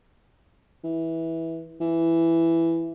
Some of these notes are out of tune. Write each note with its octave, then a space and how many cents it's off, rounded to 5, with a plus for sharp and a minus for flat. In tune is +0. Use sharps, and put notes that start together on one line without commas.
E3 -10
E3 +5